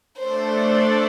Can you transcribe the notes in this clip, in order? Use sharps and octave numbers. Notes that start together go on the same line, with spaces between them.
A3 D4 A4 C5 D5